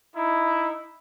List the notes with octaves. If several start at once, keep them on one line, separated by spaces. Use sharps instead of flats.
D#4 E4